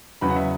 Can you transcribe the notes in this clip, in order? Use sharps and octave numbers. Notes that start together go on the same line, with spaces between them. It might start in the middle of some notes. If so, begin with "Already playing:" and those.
E2 C#3 F#3 B3 B5
F#5
E5